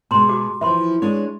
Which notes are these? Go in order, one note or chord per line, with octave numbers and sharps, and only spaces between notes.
B2 G#3 A#5 C6
F#4 G4 D6
E3 F3 E5 B5 C6
G#3 D4 C#5